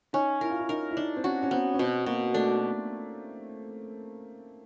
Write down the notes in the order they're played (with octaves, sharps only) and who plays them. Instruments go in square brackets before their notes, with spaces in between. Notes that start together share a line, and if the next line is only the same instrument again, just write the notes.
[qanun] C#4 [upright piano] D#4
[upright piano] E4 [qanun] A#4
[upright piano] F4
E4
[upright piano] D#4 [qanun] A#4
[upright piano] E4
[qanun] D4 [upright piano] D#4
[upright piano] C4
[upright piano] C#4 [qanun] F#4
[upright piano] C#4
[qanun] B3 [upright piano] C4
[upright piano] C#4
[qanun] B2 [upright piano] C4
[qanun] B2 [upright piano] A#3
[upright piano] A3 [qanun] D4